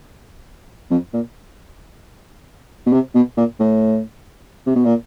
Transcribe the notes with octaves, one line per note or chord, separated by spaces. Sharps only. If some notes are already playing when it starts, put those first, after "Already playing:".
F2
A#2
B2
C3
B2
A#2
A2
C3
B2
A#2